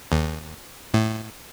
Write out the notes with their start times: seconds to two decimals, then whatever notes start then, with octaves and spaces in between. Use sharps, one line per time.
0.12 D#2
0.94 A2